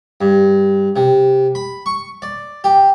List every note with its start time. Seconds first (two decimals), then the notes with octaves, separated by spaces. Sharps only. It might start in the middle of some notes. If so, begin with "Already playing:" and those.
0.21 G2
0.96 C3
1.55 B5
1.86 C#6
2.22 D5
2.64 G4